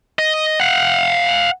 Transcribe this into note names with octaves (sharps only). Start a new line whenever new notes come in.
D#5
F5 F#5